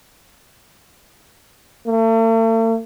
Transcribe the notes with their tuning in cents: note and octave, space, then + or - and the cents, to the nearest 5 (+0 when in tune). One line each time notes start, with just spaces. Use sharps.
A3 +45